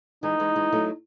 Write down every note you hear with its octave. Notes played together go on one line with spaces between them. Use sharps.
E3 G#3 D#4
E3 G#3
E3 G#3
F#3 A3